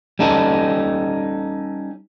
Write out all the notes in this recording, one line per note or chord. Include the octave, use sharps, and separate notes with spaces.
G3 C#4 D#4 A4